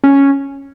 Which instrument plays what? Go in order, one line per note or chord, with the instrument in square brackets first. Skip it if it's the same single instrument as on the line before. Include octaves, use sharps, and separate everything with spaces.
[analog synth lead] C#4